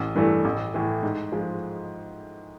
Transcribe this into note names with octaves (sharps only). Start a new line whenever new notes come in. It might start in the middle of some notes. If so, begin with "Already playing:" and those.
Already playing: A1
G2 E3 A3
A1
A2 E3
G#2
F3 G#3